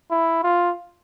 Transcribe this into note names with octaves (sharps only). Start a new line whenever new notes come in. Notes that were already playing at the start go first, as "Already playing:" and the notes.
E4
F4